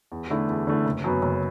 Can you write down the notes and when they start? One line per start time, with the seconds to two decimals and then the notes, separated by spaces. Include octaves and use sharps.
0.12 E2
0.30 D3 A3 E4
0.48 E2
0.67 D3 A3 E4
0.85 F#1
1.04 F#2 F#3 B3
1.22 F#1